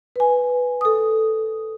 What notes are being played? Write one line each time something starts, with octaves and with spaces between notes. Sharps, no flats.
B4 G#5
A4 D#6